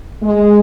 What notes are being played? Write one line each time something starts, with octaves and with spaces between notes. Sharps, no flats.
G#3